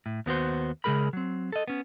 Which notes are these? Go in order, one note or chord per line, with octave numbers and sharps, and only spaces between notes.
A2
D#2 B3 F#4 C5
C#3 G#3 G#4 A#4 B5
F#3 C4
A4 D#5
B3 C#4